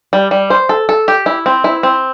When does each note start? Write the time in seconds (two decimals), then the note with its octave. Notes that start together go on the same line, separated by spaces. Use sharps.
0.13 G3
0.31 G3
0.50 C5
0.69 A4
0.89 A4
1.08 G4
1.26 E4
1.46 C4
1.64 E4
1.83 C4